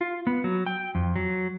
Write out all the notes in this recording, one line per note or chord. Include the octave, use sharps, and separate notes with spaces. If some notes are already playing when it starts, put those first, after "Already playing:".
F4
B3
F#3
G5
F2
F#3